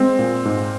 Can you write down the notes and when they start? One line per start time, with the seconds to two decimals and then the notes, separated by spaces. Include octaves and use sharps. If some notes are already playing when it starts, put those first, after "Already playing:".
Already playing: G#3 C4
0.19 A#2
0.45 G#2